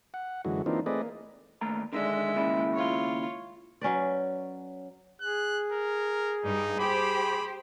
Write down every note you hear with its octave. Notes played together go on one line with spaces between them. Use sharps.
F#5
F#2 D3 E3 G#3 F#4
E3 A#3 C4 D4 D#4 F4
A3 C4 G#4 B4 D5 D#5
A#3
D#2 A3 A#5
D3 D#3 G#3 D4 E5
D#2 C#3 E4
F4 C#5
F#3 C#4 B4 D5
G#4 F#6
A#4
G2 G3 D#4
G4 C5 B5